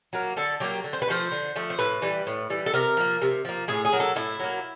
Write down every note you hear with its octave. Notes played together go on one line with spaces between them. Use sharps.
F#3 A#3
D3 A4
F#3 A#3 G4
D3
C5
B4
F3 A3 C5
D3
F3 A3
C5
A2 B4
E3 G3
A2
E3 G3
A4
C3 A#4
F3 A#3
C3
F3 A#3
A2 G#4
G#4
F#3 A#3
A4
A2 E4
F#3 A#3